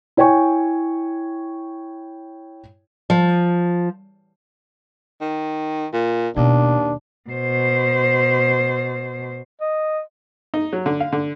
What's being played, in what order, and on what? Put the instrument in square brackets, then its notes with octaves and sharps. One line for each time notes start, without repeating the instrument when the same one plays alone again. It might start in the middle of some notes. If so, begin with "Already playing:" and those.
[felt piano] E4 C#5 G5 G#5 C#6
[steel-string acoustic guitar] F3
[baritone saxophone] D#3
A#2
[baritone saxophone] D#2 [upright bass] B2 [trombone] D4
[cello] B2 C5
[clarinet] D#5
[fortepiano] D#4
F#3
D3
F5
D3